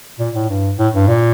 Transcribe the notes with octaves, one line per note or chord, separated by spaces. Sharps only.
A#2
A2
G2
A2
G2
A#2